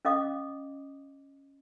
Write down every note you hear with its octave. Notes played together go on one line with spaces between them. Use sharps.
C#4 D#5 F5 D6 D#6